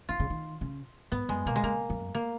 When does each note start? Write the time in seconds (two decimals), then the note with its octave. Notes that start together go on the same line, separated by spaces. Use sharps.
0.09 D#3 F4
0.20 C#3
0.30 D#3
0.61 C#3
1.12 G#2 B3
1.29 F#2 G#3
1.46 B2 A#3
1.56 G#3
1.63 C#3 A#3
1.90 F#2
2.15 A#3